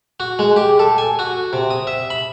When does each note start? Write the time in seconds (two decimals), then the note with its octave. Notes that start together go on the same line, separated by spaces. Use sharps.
0.20 F#4
0.39 G#3
0.56 G4
0.79 A4
0.98 G#5
1.19 F#4
1.53 C3
1.71 D#6
1.87 E5
2.10 B5